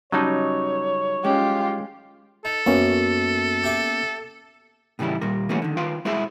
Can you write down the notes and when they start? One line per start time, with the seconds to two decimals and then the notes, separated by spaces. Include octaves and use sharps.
0.12 C#3 F#3 G3 D#4 C#5 D#5 A5
1.24 G#3 C#4 F4 G4
2.45 D#4 A4
2.66 F#2 A#3 B3 C#4 B5
3.63 G4 E5 D6
4.99 A2 C#3 E3 G3 E4
5.21 D#2 A#2 G3 A#4
5.49 E3 G3 A3 A#3 C#4 F#4
5.62 D3 D#3
5.77 D#3 F4 B4 F5 G5 C6
6.05 G#3 E4 F#4 G#4 C5 E5